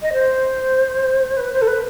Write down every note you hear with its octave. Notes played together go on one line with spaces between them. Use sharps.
D#5
C5
B4
C5
A4
B4